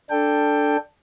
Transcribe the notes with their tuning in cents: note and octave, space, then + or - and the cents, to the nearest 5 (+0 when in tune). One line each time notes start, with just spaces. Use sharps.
D4 +0 A4 +5 G5 +10